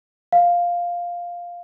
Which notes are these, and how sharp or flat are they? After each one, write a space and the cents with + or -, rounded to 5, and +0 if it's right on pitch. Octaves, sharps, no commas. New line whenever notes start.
F5 +0